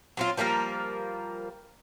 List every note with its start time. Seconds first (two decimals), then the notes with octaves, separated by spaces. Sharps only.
0.17 F#3 C4 F4
0.37 F3 G3 A#3 A#4